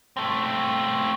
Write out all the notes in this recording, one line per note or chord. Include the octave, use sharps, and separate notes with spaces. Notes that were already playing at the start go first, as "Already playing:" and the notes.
A3 C4